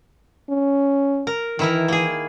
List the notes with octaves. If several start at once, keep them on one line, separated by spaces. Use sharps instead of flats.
C#4
A#4
D#3 E3 E4 A#4
A#3 G#4